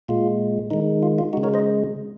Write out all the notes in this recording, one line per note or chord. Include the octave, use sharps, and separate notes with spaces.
A#2 G#3 F4
D#3 G#3 D#4
F4
F4
C#3 G#3 D#4 F#4
A#4 C#5
C5 D#5